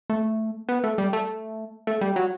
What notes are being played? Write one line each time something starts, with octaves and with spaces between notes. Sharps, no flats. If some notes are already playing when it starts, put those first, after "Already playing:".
A3
B3
A3
G3
A3
A3
G3
F#3